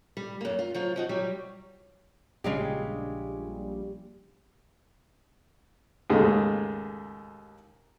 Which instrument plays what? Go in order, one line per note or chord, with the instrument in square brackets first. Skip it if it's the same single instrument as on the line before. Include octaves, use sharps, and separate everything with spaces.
[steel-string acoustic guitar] G3
F#2 A#3
F4
F3 F#3 F4
F3 D#4 F#4
F#3 G3 G4
[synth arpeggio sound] A#1 G3 [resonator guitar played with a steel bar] C#3 G#3 G4
[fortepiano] D#2 G#2 C#3 A3